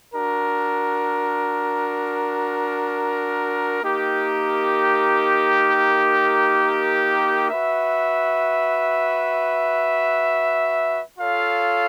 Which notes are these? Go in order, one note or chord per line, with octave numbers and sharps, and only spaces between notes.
D4 F#4 A#4
A#3 D#4 G4 A#4
F#4 B4 E5
F4 A4 C#5 F5